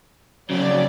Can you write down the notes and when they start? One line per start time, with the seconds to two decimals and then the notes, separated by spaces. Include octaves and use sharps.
0.50 F2 C#3 F#3 D5